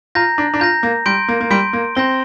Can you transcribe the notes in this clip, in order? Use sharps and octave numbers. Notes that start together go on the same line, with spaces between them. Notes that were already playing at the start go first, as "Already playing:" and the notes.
F4 A#5 G6 A#6
D4
D4
F4 A#5 G6 A#6
A#3
G3 C6 G6 D7
A#3
A#3
G3 C6 G6 D7
A#3
C4 C6 G6 A#6 G7